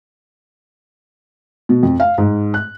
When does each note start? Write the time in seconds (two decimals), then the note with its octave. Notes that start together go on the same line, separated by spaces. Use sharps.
1.69 B2
1.83 F2
2.00 F5
2.18 G#2
2.54 F#6